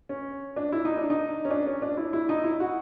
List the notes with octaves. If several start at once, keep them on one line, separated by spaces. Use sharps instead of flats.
C#4
D4
E4
D#4
D4
D#4
C#4
D4
C#4
D4
E4
E4
D#4
E4
F#4